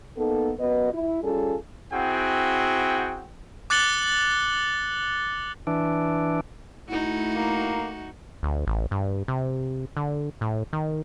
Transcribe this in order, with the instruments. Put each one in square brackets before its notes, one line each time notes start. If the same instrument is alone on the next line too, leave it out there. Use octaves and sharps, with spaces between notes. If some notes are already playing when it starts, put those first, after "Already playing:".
[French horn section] A#3 B3 D#4 A4
F#2 B3 F#4 B4 D#5
E4
G3 C#4 F4 G#4 A4
[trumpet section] C4 E4 F#4 G#4 F#5 G5
[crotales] D6 F#6 A6 C#7 F#7 G7
[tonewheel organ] E3 D4
[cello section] A3 [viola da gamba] D#4 F#4 [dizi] E4
[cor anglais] A#3
[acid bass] D2
A1
G2
C3
D3
A2
D#3